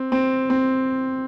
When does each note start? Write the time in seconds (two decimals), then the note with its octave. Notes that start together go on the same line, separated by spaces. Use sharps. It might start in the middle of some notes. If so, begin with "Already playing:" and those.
Already playing: C4
0.12 C4
0.50 C4